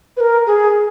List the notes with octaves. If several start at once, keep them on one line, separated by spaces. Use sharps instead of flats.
B4
A#4
G#4